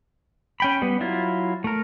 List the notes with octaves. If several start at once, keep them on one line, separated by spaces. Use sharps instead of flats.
C#4 G5 B5
G3 B3
F#3 E4 F4
A3 A#4